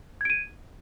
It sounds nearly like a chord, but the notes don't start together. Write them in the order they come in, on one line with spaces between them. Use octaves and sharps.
G#6 D7 D#7